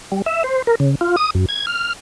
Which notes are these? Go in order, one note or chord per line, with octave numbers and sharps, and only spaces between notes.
G3
E5
C5
A#4
C#3
F4
D#6
F#2
G#6
F6